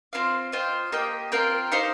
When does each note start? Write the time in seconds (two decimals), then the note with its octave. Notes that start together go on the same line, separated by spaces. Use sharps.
0.13 C4 F4 C5 F5
0.52 F4 C5 D#5 G5
0.92 A#3 G4 D#5 G5
1.32 C4 F4 A#4 G5
1.72 D#4 G4 C5 F5